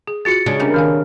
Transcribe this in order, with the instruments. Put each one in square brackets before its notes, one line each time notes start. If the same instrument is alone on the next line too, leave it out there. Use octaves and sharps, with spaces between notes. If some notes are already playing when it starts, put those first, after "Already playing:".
[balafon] G#4
[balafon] F4 F#4 G#4 [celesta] A6 C#7
[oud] C#3 D4 [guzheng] G#3
[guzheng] C3 G3 A#3 [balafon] C#4
[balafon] D#3 F5 G#5 [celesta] F6